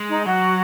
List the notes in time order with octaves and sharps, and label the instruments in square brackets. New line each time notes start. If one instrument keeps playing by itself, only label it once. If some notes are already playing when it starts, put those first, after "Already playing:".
Already playing: [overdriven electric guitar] G#3
[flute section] D#4
[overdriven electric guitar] F#3 [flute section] F#4